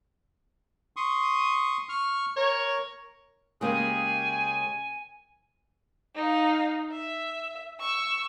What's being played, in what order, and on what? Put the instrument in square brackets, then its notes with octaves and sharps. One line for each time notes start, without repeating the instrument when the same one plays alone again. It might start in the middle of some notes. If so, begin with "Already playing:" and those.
[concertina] C6 C#6 D#6
C#6 F6
[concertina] A#4 [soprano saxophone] C#5
[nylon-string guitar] C#3 G#3 A#3 [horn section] G4 G#4 [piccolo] G#5
[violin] D#4 F5
E5
C#6 E6